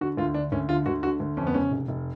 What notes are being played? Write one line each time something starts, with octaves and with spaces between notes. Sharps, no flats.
D3 F#4
D2 F4
D3 D4
D2 C#4
D3 F4
D2 F#4
D3 F#4
D2
F2 C#4
B3
C#3 C#4
F1
F1